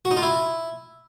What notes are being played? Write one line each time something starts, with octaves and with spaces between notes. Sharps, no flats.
F#4
D#4
F4
E4